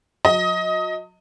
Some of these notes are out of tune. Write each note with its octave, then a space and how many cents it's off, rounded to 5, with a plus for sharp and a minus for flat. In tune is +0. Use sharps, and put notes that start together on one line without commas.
F#3 -35 D#5 +20